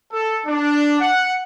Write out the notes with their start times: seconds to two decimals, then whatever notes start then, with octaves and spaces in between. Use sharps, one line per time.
0.12 A4
0.46 D4
1.00 F#5